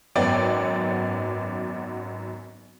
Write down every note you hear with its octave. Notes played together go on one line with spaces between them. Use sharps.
G#1 F#2 B3 C#5 D5 G5